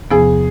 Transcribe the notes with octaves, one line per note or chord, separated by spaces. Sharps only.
E2 C3 F3 B3 G#4